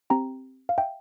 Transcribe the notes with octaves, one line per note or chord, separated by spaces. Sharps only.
C4 G4 G5 A#5
F5
E5 G5